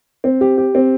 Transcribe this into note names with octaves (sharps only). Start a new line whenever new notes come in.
C4
G4
G4
C4